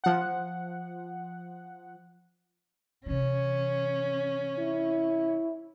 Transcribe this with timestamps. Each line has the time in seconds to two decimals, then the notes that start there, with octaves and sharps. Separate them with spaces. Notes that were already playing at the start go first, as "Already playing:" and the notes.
0.04 F3 F#5
3.06 C3 E3 C#4
4.59 E4